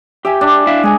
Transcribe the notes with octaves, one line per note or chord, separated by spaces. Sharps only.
G4 E5 G5 G#5
D4
E4 E5 F5
G#3 G#4 G#5